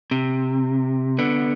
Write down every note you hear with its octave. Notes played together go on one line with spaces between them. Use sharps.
C3
D3 B3